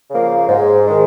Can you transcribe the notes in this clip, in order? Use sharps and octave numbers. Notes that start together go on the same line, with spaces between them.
C#3 F3 A#3
G#2
D#3 G#3